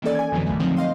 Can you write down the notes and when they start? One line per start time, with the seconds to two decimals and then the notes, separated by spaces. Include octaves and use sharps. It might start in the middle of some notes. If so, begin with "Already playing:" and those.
0.02 D#3 E3 A#3 C#4 A4 D5
0.15 G#5 G#6
0.32 F2 B2 D3 E3 F#3
0.46 A#1 A#2 D3 A3
0.60 D3 D#3 F3 F#3 C4 D#4
0.77 C5 D#5 F5 C6